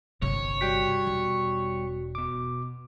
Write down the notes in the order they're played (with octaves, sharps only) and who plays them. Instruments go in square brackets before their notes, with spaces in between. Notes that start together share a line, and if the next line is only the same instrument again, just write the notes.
[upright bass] G1 C3 [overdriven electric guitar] C#5
[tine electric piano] G3 G5 B6 [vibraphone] F#4
[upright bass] E1
[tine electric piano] B2 D6